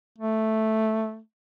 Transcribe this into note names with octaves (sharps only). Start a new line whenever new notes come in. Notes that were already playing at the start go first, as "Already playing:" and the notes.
A3